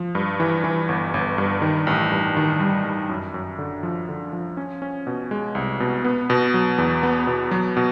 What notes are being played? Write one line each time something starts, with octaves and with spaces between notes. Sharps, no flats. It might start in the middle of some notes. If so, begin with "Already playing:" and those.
Already playing: F3
G2
E3
E3
G1
G1
G2
D#3
A1
G2
D#3
G3
G3
F#2
F#2
D3
F3
D3
F3
C#4
C#4
B2
G#3
C2
B2
B3
B2
F#3
E2
B3
B2
F#3
B2